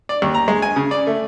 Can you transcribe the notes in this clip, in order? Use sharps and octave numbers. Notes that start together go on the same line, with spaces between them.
D5
D#2
A#5
G#3
G#5
C#3
D5
A3